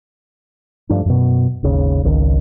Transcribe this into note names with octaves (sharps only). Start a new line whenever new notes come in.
G2 F3 A3 D4
F#2 B2
G#1 D#2 C#3
G#1 C#2 D#3